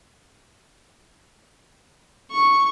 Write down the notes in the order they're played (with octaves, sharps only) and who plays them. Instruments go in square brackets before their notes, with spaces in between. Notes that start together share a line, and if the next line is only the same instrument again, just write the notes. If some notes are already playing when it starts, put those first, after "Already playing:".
[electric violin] C#6